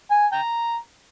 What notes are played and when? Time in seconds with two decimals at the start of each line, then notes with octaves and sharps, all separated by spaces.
0.11 G#5
0.32 G5 A#5